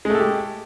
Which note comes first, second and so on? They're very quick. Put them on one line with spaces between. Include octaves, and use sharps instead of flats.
G#3 A3 A4 G4